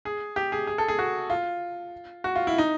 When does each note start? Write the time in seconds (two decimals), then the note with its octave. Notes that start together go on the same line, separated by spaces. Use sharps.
0.05 G#4
0.36 G4
0.52 G#4
0.67 G#4
0.78 A4
0.88 G#4
0.99 F#4
1.30 F4
2.24 F#4
2.36 F4
2.47 E4
2.58 D#4